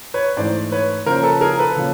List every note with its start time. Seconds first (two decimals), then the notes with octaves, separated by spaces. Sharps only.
0.14 B4 C#5
0.37 G#2 E3 A3 C5 D5
0.72 B4 C#5
1.06 C#3 F3 A#3 C#4 A#4 C5
1.23 A4 B4
1.41 G#4 A#4
1.59 A4 B4
1.76 C#3 F3 A#3 C#4